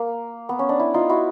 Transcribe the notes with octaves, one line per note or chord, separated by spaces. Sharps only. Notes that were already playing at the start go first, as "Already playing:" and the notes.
Already playing: A#3
B3
C#4
D4
E4
D#4 F4
E4 F#4